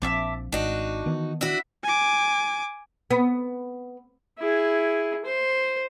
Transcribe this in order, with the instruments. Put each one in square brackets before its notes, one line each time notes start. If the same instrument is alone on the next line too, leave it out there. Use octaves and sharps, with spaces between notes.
[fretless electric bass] A#1 F3 C4 [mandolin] E5 A5 D6
[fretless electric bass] G#1 [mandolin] D4 [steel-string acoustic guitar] D#4 F#4
[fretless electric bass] D#3 E3 B3
[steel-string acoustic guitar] D4 E4 F#4 [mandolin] E5
[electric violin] G#5 D6
[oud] B3
[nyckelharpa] E4 G#4
C5